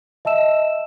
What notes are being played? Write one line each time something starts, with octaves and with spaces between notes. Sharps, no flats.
D#5 E5 A5 E6 E7